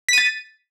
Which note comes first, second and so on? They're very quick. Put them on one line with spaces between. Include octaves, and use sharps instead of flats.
B6 D#7 A6